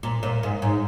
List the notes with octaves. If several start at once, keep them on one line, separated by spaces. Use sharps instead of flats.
A#2
A#2
G#2
G#2